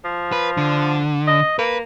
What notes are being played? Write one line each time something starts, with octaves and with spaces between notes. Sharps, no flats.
F3
B4
D3
D#5
A#3 B4